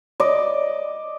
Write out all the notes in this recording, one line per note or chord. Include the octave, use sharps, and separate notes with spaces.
D5 D#5 D6